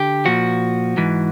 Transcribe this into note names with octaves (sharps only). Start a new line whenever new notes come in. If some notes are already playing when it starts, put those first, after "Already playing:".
Already playing: D3 G4
A#2 F3 F#4
G#2 E3